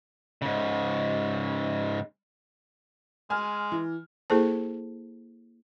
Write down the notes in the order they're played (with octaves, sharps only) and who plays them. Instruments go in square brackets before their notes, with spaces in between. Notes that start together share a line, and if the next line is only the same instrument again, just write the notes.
[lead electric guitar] G#2 C#3
[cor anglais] G#3 [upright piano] G#5 F6
[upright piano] E3
[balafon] A#3 E4 G#4 A4 C5 A5